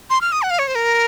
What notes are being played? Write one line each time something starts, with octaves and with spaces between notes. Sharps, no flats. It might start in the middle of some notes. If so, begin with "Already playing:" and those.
C6
F6
D#6
F#5
F5
C#5
C5
A#4